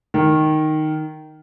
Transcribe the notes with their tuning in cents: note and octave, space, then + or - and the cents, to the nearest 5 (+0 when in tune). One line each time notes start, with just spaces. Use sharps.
D#3 -5